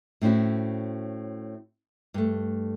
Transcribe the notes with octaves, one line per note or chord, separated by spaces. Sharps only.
A2 C4 C#4 E4 F#4
G2 A3